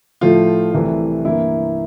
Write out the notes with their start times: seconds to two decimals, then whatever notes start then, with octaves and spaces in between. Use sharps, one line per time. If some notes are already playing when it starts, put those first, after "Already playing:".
0.21 A2 F3 A3 F4
0.73 C2 C3 E3 A3
1.24 G2 E3 A#3 E4